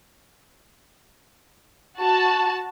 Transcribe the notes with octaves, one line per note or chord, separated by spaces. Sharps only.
F#4 A5